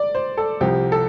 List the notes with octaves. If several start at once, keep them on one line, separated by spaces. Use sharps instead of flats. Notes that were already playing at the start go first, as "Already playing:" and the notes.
Already playing: D5
C5
A4
C2 C3 F3 G4
A4